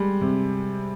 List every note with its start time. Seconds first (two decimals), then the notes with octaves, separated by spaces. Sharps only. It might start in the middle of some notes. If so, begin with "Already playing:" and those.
Already playing: G3 G#3
0.21 C3